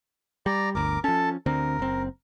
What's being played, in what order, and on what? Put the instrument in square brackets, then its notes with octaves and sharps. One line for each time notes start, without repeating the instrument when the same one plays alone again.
[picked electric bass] G3 [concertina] D5 A#5
[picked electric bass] G1 D2 [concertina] A#4 D6
[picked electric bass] F3 C#4 [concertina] A4 A5
[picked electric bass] D2 D3 C4 [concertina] A#4
[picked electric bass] F#1 C4